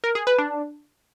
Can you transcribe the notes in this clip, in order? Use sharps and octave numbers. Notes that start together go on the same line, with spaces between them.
A#4
G#4
B4
D4